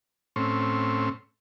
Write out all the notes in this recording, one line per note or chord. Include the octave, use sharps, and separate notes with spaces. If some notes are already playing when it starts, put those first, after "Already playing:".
A2 C4 C#4